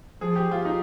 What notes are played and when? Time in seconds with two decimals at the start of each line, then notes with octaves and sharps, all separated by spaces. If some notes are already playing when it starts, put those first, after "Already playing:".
0.21 F3 G#4
0.36 G4
0.51 F4
0.65 D#4